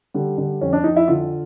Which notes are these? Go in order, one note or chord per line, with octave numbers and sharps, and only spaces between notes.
D3 G3
D3
F2 C#4
D4
F2 D#4
E4
D3 F4